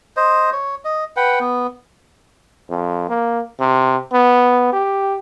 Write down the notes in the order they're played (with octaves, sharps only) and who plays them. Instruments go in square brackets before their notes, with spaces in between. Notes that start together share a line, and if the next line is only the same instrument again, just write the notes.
[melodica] C5 D#5
C#5
D#5
B4 F#5 G5
B3
[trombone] F2
A#3
C3
B3
G4